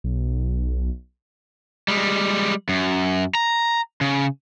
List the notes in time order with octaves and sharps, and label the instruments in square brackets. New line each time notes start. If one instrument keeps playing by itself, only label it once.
[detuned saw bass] B1
[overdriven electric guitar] G3 G#3
F#2
A#5
C#3